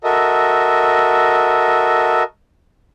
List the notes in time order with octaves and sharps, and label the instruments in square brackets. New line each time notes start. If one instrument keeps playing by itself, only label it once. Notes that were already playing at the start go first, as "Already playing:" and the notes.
[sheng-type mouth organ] F#4 A4 A#4 D#5 E5